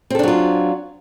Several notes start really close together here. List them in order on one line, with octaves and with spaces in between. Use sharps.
C4 A4 D4 F#3 F4